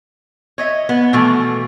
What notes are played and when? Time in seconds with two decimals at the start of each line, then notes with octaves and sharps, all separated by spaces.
0.58 C#5 D#5 E5
0.89 B3
1.13 B2 E3 F3 A3